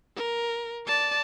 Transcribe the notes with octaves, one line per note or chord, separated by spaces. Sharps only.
A#4
D5 A5